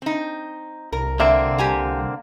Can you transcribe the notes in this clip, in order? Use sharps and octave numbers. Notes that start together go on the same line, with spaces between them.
C4 D#4
C2 A#4
D3 A#3 C4 E5
G4 G#5 A#5